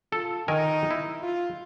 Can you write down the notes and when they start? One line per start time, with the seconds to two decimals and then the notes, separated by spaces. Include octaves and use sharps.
0.12 F4 A4
0.48 D#3 D#4 A#4 G#5
0.90 E4
1.23 F4